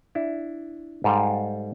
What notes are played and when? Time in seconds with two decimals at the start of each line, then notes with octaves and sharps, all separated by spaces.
0.15 D4 E4
1.04 G#2 G3 A4 F5 G5